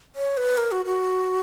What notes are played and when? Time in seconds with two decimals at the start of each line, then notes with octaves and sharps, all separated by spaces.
0.16 C#5
0.37 B4
0.57 A#4
0.72 F#4
0.86 F#4